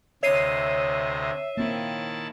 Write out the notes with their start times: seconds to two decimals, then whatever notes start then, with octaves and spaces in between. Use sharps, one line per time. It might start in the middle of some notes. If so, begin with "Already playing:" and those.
0.23 D2 C3 C#5 D#5 E5 C7 D#7
1.57 D#3 A#3 C4 E4 A5